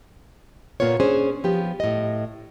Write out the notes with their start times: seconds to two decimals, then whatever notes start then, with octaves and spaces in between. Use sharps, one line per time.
0.80 A#2 A#3 B3 F4 C#5
1.00 C#4 D4 G#4 C5
1.44 F3 B3 G4
1.80 A2 D#5